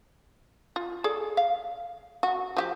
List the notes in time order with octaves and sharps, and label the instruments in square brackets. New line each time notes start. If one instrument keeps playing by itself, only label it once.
[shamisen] F4
G#4 A4 D5
F5
F#4
F3 F#4 G4